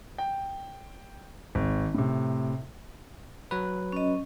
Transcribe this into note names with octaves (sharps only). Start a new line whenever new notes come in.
G5
G#1
A2 C3
F#3 B4
C#4 D#5